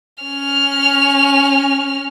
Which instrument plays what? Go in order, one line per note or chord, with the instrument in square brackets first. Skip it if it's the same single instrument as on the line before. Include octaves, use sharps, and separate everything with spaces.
[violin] C#4 F6